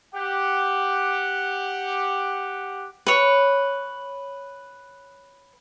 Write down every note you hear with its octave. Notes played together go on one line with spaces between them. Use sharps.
G4 F#5
B4 C#5